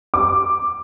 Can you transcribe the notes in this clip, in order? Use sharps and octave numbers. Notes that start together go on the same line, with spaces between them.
D6